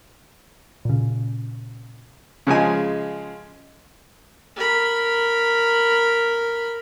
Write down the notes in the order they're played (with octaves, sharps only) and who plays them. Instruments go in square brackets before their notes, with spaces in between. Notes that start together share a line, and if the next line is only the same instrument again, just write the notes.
[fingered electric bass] A#2 C#3
[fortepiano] C#3 F3 G#3 G#5
[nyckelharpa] A#4 B5